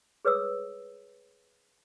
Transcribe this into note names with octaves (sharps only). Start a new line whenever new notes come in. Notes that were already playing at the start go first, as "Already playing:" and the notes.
G#4 B4 C#5 D#6 E6